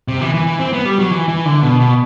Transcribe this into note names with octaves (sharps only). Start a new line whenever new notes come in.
C3
E3
E3
E3
C4
B3
G3
F#3
E3
E3
D3
B2
B2